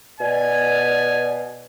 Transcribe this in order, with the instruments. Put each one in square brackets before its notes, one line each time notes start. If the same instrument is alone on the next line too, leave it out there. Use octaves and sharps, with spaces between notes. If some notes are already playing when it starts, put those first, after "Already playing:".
[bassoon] B2 [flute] D5 [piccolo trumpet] G#5